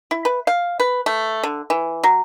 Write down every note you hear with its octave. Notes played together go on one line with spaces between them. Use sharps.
E4
B4
F5
B4
A3
D3
E3
F#3